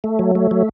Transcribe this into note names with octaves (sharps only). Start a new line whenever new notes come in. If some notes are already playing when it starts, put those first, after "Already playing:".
A3
F#3
A3
F#3